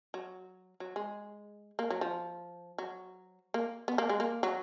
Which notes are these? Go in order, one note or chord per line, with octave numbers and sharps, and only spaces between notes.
F#3
F#3
G#3
A#3
F#3
F3
F#3
A#3
B3
A#3
G#3
A#3
F#3